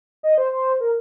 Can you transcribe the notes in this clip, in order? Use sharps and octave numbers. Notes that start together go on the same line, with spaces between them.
D#5
C5
C5
A#4